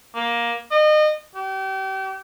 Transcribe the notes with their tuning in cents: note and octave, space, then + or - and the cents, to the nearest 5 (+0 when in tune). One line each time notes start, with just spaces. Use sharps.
A#3 +15
D#5 -30
G4 -35